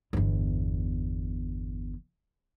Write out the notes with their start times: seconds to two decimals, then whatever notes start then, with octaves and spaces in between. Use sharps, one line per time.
0.13 G1 E2